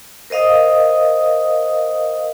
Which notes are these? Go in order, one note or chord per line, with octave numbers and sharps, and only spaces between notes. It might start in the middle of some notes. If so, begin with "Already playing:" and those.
A#4 C5 D#5 F5 D#6